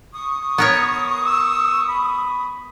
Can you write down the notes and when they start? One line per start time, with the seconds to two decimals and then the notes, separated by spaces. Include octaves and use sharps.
0.14 C#6 D#6
0.58 B3 A#4 C#5
1.25 E6
1.88 B5